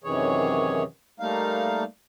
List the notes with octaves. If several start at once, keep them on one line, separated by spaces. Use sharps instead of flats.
F#2 C3 D#3 E3 G#4 C#5
G3 A3 A#3 D#4 F5